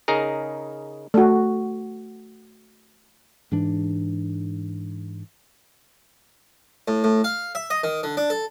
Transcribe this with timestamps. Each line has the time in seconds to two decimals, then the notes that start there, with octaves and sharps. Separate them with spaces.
0.08 C#3 D#4 G#4 A#4
1.14 A3 F#4
3.52 G#2 E3 D4
6.88 A2
7.04 A2
7.24 F5
7.55 E5
7.70 D#5
7.83 D#3
8.03 D3
8.17 D4
8.30 A4